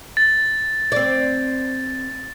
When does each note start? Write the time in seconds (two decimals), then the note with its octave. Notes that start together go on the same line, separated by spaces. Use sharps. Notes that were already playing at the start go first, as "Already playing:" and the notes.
0.17 A6
0.92 C4 D5